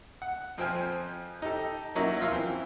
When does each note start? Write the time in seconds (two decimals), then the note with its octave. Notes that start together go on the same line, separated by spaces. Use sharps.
0.22 F#5
0.58 F2 F3 C5 G5 G#5 F6
1.42 D#4 G4 A4
1.95 F#3 A#3 C#4 D#4 E4 F#4
2.20 F3 F4 E5
2.31 E3 C4